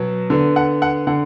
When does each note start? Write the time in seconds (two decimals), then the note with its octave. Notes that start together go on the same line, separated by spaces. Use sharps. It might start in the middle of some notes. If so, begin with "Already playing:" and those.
Already playing: B2 F#3 B3
0.30 D3 B3
0.56 F#5
0.82 F#5
1.07 D3 F#5